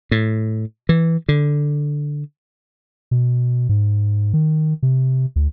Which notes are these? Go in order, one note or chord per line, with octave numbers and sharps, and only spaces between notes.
A2
E3
D3
B2
G#2
D#3
C3
D2